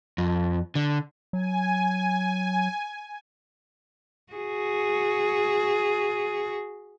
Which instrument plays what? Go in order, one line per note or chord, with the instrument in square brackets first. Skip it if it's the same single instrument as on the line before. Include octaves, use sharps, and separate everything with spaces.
[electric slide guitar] F2
D3
[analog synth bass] F#3 [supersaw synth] G#5
[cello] F#4 G#4